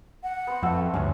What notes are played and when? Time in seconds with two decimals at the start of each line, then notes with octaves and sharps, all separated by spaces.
0.23 F#5
0.47 B3 C5
0.63 F2 A3 E6
0.94 D2 G2 C#4 C#5